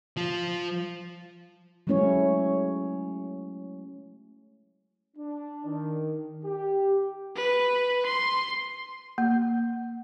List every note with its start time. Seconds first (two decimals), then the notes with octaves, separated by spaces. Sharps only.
0.17 F3 F4
1.87 F#3 G#3 A3 C#4 E4 C#5
5.17 D4
5.66 D#3
6.44 G4
7.36 B4
8.06 C6
9.18 A#3